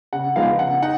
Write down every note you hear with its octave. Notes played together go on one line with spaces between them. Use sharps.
C#3 F#5
F3 G#3 B3 D#4 F5
C#3 F#5
D#4 F#5